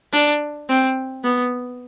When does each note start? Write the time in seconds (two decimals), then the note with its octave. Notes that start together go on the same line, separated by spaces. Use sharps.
0.13 D4
0.69 C4
1.23 B3